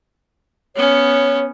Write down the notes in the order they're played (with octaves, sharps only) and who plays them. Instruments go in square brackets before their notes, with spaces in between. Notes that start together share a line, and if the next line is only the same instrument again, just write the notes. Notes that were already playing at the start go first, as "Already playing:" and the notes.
[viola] B3 C#4 [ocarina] C#5